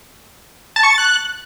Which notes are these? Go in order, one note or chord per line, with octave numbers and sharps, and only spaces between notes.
A5
C#6
A6
F#6